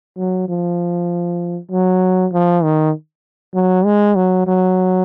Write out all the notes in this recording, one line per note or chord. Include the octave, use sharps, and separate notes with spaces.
F#3
F3
F#3
F3
D#3
F#3
G#3
F#3
F#3